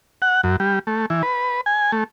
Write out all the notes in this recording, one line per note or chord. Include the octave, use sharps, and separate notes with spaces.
F#5
F#2
G3
A3
E3
B4
G#5
A3